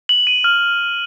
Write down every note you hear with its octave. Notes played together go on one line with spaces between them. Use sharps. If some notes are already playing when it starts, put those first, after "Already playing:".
F#7
D#7
F6